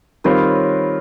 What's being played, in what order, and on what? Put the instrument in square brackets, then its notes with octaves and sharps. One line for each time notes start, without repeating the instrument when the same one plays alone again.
[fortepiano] D#3 G3 C4 F4 A#4 [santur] B4 C#5